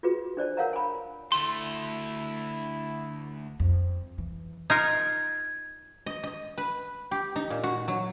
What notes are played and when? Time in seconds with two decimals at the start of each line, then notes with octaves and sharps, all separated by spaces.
0.03 F4 F#4 G#4 B4
0.37 D4 C5 D5 A5
0.57 A#4 C#5 F5 F#5 A5 A#5
0.73 G#5 B5
1.32 D2 A3 E4 C6
3.60 F2
4.18 E3
4.70 D#4 F4 A#4 G#6
6.06 D#5
6.23 D#5
6.58 B4
7.11 G4
7.36 D#4
7.50 A#2
7.63 F#4
7.88 F#3